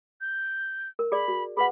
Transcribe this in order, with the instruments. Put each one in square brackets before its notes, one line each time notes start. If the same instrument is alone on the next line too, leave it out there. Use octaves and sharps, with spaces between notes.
[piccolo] G6
[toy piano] A#4
[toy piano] G#4 D5 [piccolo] B5
[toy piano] F#4
[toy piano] G#4 B4 F#5 [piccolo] B5